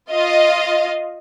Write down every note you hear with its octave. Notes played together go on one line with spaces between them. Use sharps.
F4 D#5 F5